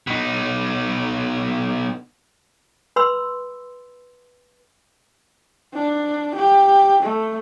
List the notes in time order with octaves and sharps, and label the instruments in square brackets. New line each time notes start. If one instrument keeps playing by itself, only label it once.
[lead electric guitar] B2 D#4
[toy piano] B4 B5 C6 E6
[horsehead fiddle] D4
G4
A3